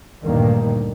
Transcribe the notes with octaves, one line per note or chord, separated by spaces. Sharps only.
D2 G2 A#2 D#3 A#3